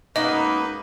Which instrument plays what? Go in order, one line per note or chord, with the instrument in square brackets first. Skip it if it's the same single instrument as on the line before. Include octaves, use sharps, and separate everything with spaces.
[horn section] F#2 G#3 B4 [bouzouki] A#3 B3 [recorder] D#4 [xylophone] D#5